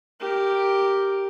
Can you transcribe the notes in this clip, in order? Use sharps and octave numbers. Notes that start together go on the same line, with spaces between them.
G4 A#4